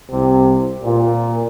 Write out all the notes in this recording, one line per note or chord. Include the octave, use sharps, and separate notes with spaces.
C2 C3
A#2